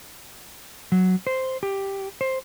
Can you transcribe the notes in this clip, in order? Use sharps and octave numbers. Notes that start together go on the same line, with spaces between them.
F#3
C5
G4
C5